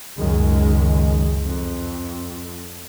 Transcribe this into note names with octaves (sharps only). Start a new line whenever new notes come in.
C#2 F#2 D#3 G#3
F2